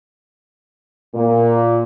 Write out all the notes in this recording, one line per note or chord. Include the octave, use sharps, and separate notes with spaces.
A#2